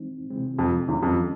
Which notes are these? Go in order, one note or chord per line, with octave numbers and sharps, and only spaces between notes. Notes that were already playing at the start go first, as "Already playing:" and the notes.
Already playing: E3 G#3 C4 D#4
C3 E3 G#3 C4
F2
E2 D#3 G#3 C#4
F2